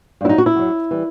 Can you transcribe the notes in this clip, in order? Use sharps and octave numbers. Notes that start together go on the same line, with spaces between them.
G2 F#3 E4
D#4
F#4
E4
F#2 F#3
E3 G3